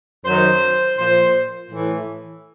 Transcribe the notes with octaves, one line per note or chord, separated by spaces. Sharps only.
F#2 D#3 F#3 C5
A#2 F3 C5
A2 E3